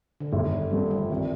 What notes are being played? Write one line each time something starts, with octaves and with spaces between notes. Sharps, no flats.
D3
G1 D#3
G3
G2 D3 F3 G3
F3
G3
C2 D#3